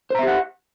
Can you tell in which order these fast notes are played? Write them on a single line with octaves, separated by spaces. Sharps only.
C5 A#5 E5 G4 F#5